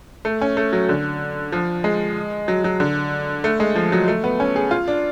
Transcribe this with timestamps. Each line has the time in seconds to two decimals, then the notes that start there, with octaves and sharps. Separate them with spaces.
0.25 A3
0.41 C#4
0.57 A3
0.73 F#3
0.89 D3
1.52 F3
1.84 G#3
2.48 F#3
2.64 F#3
2.80 D3
3.44 A3
3.60 G#3
3.76 F3
3.92 F#3
4.08 A3
4.24 B3
4.40 C#4
4.56 G#4
4.71 F4
4.88 D4